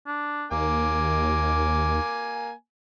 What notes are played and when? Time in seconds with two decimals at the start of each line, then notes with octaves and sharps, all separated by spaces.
0.07 D4
0.52 D#2 A#3 G#5 D6